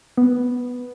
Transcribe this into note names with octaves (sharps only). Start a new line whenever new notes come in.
B3